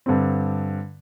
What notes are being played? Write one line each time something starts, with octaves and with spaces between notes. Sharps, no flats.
G2 D3 C4